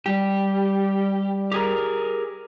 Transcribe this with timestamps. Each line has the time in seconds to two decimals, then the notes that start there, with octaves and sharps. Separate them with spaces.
0.06 G3 G4
1.52 G4 G#4 A#4